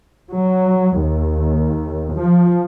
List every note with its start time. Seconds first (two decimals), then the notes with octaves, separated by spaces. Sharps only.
0.31 F#3
0.99 D#2
2.14 F3